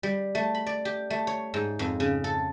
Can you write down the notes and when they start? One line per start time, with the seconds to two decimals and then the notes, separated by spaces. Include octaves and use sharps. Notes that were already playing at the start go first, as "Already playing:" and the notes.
0.03 G3
0.35 A3
0.55 B5
0.66 D5
0.85 G4
1.10 A3
1.27 C#5
1.54 G#2
1.79 F2
2.00 C#3
2.24 A4